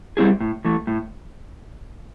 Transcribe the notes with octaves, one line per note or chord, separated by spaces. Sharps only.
G3 C4 E4 G#4
A2
E3 A3
A2